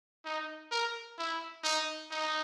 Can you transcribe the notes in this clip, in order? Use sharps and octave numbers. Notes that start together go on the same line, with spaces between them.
D#4
A#4
E4
D#4
D#4